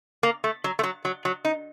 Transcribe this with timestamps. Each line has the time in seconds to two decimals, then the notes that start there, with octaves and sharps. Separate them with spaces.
0.23 A#3
0.44 A3
0.64 F#3
0.79 A3
0.83 F#3
1.05 F#3
1.25 F#3
1.45 D#4